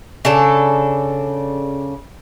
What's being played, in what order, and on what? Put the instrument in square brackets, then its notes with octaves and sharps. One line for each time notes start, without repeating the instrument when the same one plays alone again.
[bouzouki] C#3 D4 A4